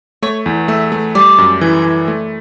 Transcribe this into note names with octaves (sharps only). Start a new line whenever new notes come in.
A3 C#5
E2
A3 E5
A3
G3 D5
F#2
E3
E3
A3